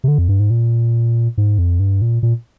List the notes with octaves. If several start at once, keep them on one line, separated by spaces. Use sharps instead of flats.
C3
D3
F2
G2
G#2
A#2
G#2
F2
G2
A#2
A#2